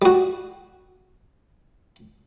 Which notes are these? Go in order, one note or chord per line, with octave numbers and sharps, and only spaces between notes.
G3 F#4